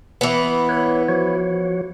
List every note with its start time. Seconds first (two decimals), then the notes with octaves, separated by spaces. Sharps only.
0.21 E3 B3
0.69 B4 C#5
1.09 F3 F#4 C#5